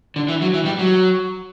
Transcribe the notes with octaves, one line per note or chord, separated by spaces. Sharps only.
D3
E3
F#3
E3
G3
F#3